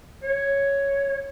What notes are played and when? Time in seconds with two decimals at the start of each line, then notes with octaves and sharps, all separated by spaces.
0.23 C#5